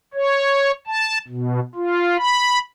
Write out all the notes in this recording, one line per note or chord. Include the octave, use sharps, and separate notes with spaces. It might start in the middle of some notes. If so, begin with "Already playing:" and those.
C#5
A5
B2
F4
B5